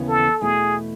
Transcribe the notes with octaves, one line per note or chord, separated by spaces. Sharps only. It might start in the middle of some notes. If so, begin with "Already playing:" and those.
Already playing: D#2 C#3 E3 B3 E4
A4
E2 B2 A3 E4 G#4